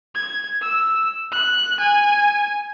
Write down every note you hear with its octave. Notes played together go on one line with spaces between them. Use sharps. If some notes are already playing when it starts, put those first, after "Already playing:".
G#6
E6
F#6
G#5